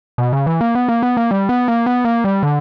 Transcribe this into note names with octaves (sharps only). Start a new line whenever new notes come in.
B2
C#3
E3
A#3
B3
A#3
B3
A#3
G3
B3
A#3
B3
A#3
G3
D3